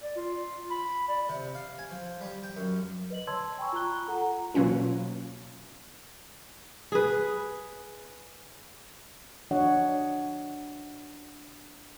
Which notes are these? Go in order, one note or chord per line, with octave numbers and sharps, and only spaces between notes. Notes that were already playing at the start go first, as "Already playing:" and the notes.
D5
F4
B5
D5
C3
F5
G#5
F3
G3
G5
F#2
B4 D#5 F#7
C#5 A5 C6 E6 G#6
G5 G#5 B5 C#6 E6
F4 A#5 C#6 F#6 G7
F4 A4 F#5 A#5
B2 E3 F#3 A#3 C#4 F4
G#4 B4
F3 D4 F#4 C#5 D#5 F#5